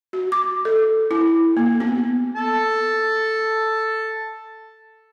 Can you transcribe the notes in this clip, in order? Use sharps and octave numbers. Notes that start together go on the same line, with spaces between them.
F#4
D6
A4
E4
A#3
B3
A4 A5